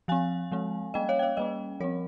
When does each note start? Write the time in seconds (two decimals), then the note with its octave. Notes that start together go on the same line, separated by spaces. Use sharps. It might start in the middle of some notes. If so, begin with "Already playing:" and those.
0.08 F3 C4 F5 G#5
0.52 F3 G#3 C4
0.94 G3 A#3 C#4 D#5 G5
1.09 C#5 F5
1.19 G5
1.22 C#5 F5
1.37 G3 A#3 C#4 D#5 G5
1.80 F3 C4 A#4 C#5